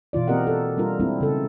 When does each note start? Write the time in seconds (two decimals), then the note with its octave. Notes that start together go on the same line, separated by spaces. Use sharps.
0.13 B2 E3 F4 D5
0.28 A#3 C4 G4 A#4 D#5 F#5
0.47 A4
0.77 G3 D4 F4 A#4
1.00 G#3 A#3 C4 D4 E4
1.21 C#3 A4